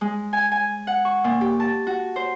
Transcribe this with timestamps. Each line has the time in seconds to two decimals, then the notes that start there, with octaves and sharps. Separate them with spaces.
0.01 G#3
0.33 G#5
0.52 G#5
0.87 F#5
1.05 C#6
1.24 A#2
1.41 G4
1.60 A5
1.87 F#4
2.16 C5